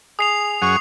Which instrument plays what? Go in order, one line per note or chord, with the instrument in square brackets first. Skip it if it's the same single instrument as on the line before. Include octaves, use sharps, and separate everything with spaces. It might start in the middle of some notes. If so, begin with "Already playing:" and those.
[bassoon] G#4 [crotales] D#6 C7 F7
[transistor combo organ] F#2 G#4 F#5 [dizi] C#6